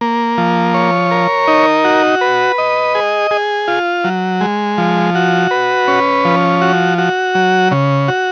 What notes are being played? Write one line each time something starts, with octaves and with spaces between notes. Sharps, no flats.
A#3
F3
C#5
A#4
D#4
F#4
B4
D#5
G#4
G#4
F4
F#3
G#3
F3
F#4
B4
C#4
F3
F#4
F#4
F#3
C#3
F#4